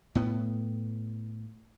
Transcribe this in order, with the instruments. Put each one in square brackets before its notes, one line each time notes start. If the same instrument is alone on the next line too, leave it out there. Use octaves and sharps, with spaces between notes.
[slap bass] A2 B3